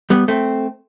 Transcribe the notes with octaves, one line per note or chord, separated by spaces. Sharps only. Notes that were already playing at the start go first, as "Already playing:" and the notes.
G3 B3
A3 C4